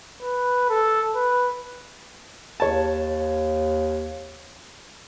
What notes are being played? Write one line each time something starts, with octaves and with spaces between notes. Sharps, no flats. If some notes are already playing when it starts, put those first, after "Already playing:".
B4
A4
B4
D#2 C#5 A5